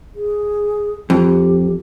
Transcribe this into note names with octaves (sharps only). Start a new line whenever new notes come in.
G#4
F2 G4